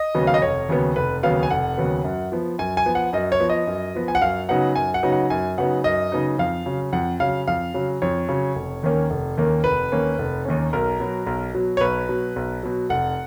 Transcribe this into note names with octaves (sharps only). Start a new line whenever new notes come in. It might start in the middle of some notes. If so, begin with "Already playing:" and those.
Already playing: D#5
D#2 C#3 F#3 B3
F5
D#5
F1 C#5
D#2 C#3 F#3 B3
F1 B4
D#2 C#3 F#3 B3 F5
G#5
F1 F#5
D#2 C#3 F#3 B3
F#2
F3 B3
F#2 G#5
G#5
F3 B3
F#5
F#2 D#5
C#5
F3 B3
D#5
F#2
F3 B3
G#5
F#5
F#2 F5
C#3 F#3 B3 D#4 F#5
F#2 G#5
F#5
C#3 F#3 B3 D#4
F#5
F#2 G#5
C#3 F#3 B3 D#4 F#5
F#2 D#5
C#3 F#3 B3 D#4
F2 F5
C#3 F#3
F2 F#5
C#3 F#3 F5
F2 F5
C#3 F#3
F2 C#5
C#3 F#3
F1
D#2 D#3 A#3 C#4
F1
D#2 D#3 A#3 C#4
F1 B4
D#2 D#3 A#3 C#4
F1
D#2 D#3 A#3 C#4
B1 A#4
B2 F#3
B1
B2 F#3
C#5
B1 B4
B2 F#3
B1
B2 F#3
F1 F#5